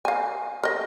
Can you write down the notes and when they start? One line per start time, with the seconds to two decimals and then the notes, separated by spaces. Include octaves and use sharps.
0.05 F5 G#5
0.63 A#4 D#5